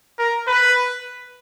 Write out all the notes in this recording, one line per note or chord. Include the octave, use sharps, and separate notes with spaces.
A#4
B4